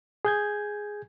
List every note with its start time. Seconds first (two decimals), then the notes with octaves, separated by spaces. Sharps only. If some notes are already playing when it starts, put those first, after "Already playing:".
0.25 G#4 G6 G#6